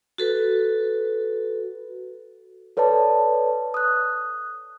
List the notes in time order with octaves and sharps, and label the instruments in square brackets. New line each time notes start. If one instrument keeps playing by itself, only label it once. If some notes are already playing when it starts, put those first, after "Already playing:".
[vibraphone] F#4 A4 B4
[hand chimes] A4 B4 C#5 D5 A5
D#6 F#6